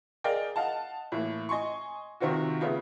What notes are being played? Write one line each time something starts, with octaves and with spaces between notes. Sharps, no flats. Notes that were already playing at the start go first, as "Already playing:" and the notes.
G#4 A#4 D5 D#5 F5 G5
D#5 F5 F#5 A5
A2 E3 A#3
D#5 G#5 C6 C#6
C3 D#3 C4 F4 F#4
C#3 A3 B3 F4